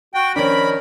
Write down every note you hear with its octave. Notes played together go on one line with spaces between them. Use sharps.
F#4 G5
D#3 F3 C#4 D4 A#4 B5